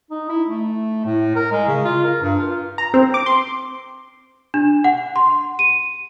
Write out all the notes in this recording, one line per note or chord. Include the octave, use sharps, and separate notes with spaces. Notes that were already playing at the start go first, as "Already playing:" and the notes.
D#4
E4
A3
A2
A#4
G#3
C#3
F4
A#4
G2
F4
A#5
C4
D6
C6
D4
F#5
C6
D#7